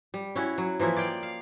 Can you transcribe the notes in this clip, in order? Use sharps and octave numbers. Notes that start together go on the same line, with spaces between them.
G3
C#4 E4 F#4
F#3
E3 F3 A#3 E4
D5 F5 G5
F5